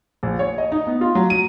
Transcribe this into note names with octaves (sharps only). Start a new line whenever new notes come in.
A#1
C#5
D#5
D#4
B3
F4
F#3
D#7